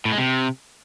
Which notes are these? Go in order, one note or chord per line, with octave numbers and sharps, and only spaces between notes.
A2
G#3
C3